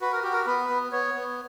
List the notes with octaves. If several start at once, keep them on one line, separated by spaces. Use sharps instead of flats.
F#4 B4
A#4
F#4 G4
A#4
B3 B4
B3
B3 C#5
B3